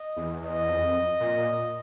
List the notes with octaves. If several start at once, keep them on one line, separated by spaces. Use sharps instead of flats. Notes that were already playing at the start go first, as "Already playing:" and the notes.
Already playing: D#5
E2
E2 D#5
F2
E2
F2
A#2